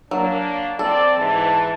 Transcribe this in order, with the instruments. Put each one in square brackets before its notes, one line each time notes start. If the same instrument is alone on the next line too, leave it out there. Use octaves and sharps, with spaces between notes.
[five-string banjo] F#3 [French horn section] A#3 D4
[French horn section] C4 D5 [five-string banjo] A4
[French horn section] G#2 E3 [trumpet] A5